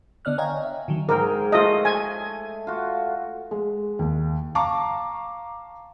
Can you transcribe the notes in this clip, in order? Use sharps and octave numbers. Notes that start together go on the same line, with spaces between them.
D3 B3 D5 D#5 F6 F#6
C#5 D#5 F5 G5 G#5 A#5
E5
D3 D#3 F#3
G#2 G#4 A#4 G5
A3 F4 D#5
G#5
F4 F#4
G#3
D#2
F5 A5 A#5 C#6 D6